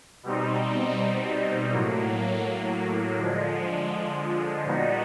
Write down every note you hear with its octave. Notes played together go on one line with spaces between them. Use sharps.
B2 G3 C4 D#4
A2 F#3 A#3
D3 F3 G#3
A#2 G3 B3 D#4 F#4